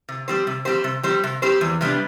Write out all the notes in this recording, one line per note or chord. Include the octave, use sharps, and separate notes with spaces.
C3
G3 C4 G4 C5
C3
G3 C4 G4 C5
C3
G3 C4 G4 C5
C3
G3 C4 G4 C5
E2
C3 G3 B3 D4